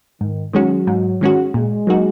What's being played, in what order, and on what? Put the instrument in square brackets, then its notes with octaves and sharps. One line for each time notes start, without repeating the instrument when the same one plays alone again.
[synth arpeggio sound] G#2 [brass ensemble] D#3
[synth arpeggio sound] D#3 G#3 C#4 F#4 [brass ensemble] F#3
[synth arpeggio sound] G#2
D#3 G#3 C#4 F#4
[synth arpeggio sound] A#2 [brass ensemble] G#3
[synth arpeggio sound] F#3 A#3 D#4 F#4